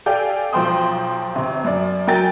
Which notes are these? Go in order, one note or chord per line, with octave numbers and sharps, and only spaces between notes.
G4 A4 D5 F5 G5 G#5
B1 F3 C5 G5 C6 D#6
G1 C3
F#2 D5
F#3 A#4 G5 G#5 A6